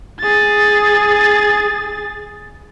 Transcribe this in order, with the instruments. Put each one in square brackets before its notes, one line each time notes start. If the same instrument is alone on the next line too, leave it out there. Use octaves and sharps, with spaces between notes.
[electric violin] G#4 A6